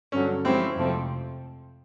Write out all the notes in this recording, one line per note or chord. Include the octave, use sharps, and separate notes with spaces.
G2 D3 F#3 C#4
F3 G#3 C4 C#4 E4 G4
F2 C3 F3 A3 C4